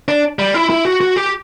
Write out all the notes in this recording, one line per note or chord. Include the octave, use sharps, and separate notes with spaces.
D4
G3
E4
E4
F#4
F#4
G4